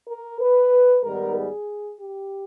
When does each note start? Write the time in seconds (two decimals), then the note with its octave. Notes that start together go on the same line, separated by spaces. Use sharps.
0.08 A#4
0.40 B4
1.04 G#2 D#3 G3 B3 A#4
1.36 G#4
2.00 G4